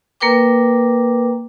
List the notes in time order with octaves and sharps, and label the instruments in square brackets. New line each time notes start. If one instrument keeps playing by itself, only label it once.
[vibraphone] A#3 A#4 B4 G5 D6